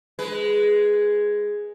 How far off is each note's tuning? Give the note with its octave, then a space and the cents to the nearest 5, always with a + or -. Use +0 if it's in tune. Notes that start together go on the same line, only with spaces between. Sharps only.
G#3 +0 B4 +0